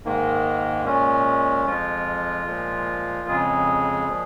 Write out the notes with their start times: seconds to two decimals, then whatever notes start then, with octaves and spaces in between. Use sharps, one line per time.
0.05 G#2 D#3 G#3 A#3
0.85 A#2 G#3 C#4
1.66 F2 F3 G#3 F4
2.46 A#2 F3 G#3
3.28 F2 C#3 G#3 G#4
4.08 A#2 F3 G#3